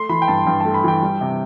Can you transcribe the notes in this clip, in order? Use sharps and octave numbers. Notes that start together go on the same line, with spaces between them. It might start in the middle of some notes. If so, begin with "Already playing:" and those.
Already playing: A3 C6
E3 B5
G5
G2 A5
G2 G5
A3 A5
B5
E3 G5
G3
C3